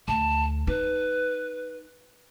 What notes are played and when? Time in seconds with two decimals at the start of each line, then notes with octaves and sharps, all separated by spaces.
0.08 D2 A5
0.67 D#4 B4